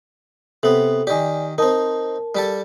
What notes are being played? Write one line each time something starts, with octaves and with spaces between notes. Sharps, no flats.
C3 B3 A4 F#7
D#3 G4 D5 G#5
C4 D#4 A#4 A5
G3 G4 A4